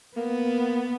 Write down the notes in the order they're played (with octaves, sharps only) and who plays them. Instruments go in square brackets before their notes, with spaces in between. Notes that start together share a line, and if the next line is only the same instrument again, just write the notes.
[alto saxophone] A#3 [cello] B3